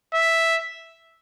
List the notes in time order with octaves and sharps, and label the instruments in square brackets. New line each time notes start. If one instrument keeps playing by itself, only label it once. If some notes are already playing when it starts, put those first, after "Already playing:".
[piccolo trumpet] E5